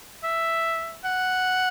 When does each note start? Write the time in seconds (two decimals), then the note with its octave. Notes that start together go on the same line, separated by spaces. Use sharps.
0.24 E5
1.05 F#5